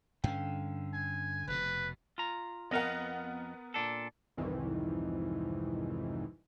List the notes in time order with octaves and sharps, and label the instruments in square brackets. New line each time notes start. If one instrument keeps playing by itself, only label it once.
[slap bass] G2 C#4 [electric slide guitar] D3 F5 G5
[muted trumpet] G#5
[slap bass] F1 B2 [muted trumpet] B4
[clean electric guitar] F4 A#5
[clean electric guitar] F2 D#5 F5 [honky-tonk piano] B3 A#4 F#5
[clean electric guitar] A#2 D4 A4
[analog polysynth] C2 F2 G#2 D#3 E3